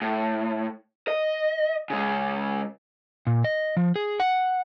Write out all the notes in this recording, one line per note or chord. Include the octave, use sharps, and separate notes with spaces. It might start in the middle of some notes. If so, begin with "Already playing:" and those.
A2
D#5
C#3 G#3
A#2
D#5
F3
G#4
F#5